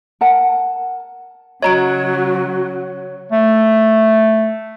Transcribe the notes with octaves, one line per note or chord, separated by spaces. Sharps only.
A#4 F#5 A5
C#3 F#3 F#4 C#5 D#5 A#5 D7
A3